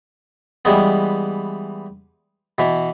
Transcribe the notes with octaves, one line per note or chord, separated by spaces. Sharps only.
E3 G3 G#3 B3
B2 E3